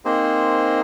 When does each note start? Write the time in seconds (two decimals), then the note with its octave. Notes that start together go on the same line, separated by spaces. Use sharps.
0.05 A#3 C4 D#4 G#4 C5